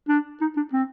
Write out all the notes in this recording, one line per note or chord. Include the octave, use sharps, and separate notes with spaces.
D4
D#4
D4
C4